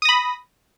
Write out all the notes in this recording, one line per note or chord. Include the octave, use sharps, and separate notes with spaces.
B5 D#6 A#6